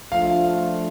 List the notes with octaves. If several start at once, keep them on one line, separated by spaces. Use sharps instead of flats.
F3 A3 D4 F4 F5